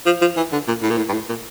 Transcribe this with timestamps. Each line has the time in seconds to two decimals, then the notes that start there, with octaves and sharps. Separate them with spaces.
0.06 F3
0.21 F3
0.37 E3
0.52 D3
0.68 A#2
0.82 A2
0.90 A#2
0.97 A2
1.09 G2
1.13 A2
1.29 A#2